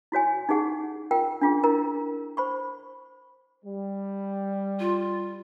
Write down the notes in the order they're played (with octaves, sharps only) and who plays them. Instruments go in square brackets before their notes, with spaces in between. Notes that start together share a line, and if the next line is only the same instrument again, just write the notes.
[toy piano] E4 F#4 C#5 G#5
D#4 G4 G#4 F#5
F4 A#4 G5
D4 F4 G#4
E4 A#4 A#5
C5 B5 C#6
[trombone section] G3
[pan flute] F4